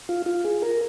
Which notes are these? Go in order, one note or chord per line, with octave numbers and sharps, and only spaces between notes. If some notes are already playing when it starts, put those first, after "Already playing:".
F4
F4
G#4
A#4